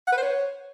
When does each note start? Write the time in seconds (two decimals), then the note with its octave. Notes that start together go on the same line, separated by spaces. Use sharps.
0.07 F#5
0.12 B4
0.17 C5
0.22 C#5